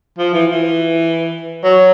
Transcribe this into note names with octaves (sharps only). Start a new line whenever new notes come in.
F3
E3
E3
F#3